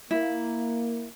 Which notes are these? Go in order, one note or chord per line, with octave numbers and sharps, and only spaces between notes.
A#3 E4